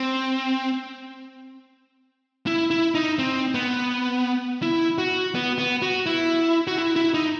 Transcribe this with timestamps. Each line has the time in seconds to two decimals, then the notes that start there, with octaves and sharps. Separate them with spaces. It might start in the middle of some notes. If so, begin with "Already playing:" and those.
Already playing: C4
2.47 E4
2.71 E4
2.95 D#4
3.19 C4
3.54 B3
4.62 E4
4.98 F#4
5.35 B3
5.58 B3
5.82 F#4
6.06 E4
6.67 F#4
6.78 E4
6.96 E4
7.14 D#4